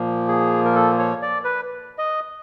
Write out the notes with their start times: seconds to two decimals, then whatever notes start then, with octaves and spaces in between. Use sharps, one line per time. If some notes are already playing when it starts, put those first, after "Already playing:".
Already playing: A#2 F3 A#3
0.28 G#4
0.65 A#4
0.75 A4
0.98 C#5
1.22 D5
1.44 B4
1.98 D#5